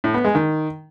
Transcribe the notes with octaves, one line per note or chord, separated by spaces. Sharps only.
A2
B3
G#3
D#3